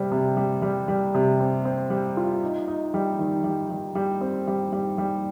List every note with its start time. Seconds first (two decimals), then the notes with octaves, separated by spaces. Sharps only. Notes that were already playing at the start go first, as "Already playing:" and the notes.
Already playing: C3 G3 C4
0.12 C3
0.37 G3
0.62 G3
0.88 G3
1.14 C3
1.40 C4
1.65 C4
1.90 G3
2.17 F4
2.43 D#4
2.68 D#4
2.94 G3
3.19 D#3
3.44 G3
3.70 G3
3.95 G3
4.21 C4
4.47 G3
4.72 G3
4.98 G3